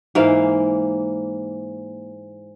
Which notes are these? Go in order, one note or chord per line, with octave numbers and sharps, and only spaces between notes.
G#2 E3 A#3 F5